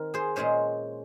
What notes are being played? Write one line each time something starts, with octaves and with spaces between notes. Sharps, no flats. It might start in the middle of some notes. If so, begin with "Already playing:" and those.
Already playing: D#3 C4 A#4
G#4 C5
A#2 G#3 C#4 G#4 C5